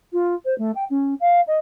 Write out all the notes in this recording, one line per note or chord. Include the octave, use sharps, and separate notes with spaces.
F4
C5
A3
G5
C#4
F5
D#5